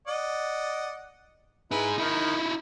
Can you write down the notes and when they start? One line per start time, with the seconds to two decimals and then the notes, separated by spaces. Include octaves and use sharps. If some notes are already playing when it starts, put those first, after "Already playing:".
0.07 D5 D#5 F#5
1.71 D#4 E4 G#4 B4
1.98 D#3 D#4 E4